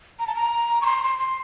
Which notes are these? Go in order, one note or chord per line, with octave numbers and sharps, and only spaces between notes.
A#5
A5
A#5
C#6
C6
C6
C6